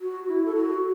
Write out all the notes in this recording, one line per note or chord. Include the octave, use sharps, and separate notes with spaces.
F#4
E4
A4
F#4